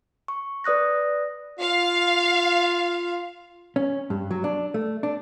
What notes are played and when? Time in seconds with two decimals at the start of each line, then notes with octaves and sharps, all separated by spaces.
0.28 C#6
0.64 B4 D5 D#6 F#6 A#6
1.60 F4 F5
3.76 C#4
4.10 G2
4.31 F#3
4.44 D4
4.74 A3
5.03 D4